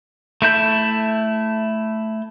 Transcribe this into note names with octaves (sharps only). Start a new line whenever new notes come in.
A3 E4 G6